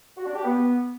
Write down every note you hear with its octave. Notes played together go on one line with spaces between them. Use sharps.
F#4
D4
G4
B3